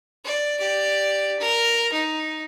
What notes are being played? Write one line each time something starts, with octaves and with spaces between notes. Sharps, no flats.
D5
G4 D5
A#4
D#4